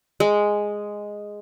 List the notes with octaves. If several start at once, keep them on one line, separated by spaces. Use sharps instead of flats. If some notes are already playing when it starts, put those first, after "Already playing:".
G#3